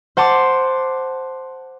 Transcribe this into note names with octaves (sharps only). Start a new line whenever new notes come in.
C5 F#5 A5 C6 D6